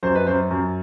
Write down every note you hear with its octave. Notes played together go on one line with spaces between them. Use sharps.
F#2 C5
B4
F#2 C5
F#2